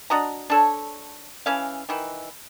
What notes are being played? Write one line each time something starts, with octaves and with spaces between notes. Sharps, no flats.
D4 F#4 D#5 A#5
D4 A4 C#5
E3 C#4 F5
D#3 E3